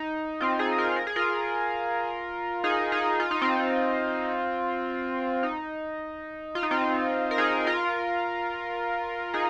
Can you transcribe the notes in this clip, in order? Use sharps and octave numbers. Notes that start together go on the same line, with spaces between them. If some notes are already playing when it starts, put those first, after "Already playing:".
Already playing: D#4
C4 F4
D#4 G#4
F4 A#4
A#4
G#4
F4 A#4
D#4 G#4
D#4 G#4
F4
D#4
C4 F4
D#4
F4
D#4
C4 F4
A#4
D#4 G#4
F4 A#4
D#4 G#4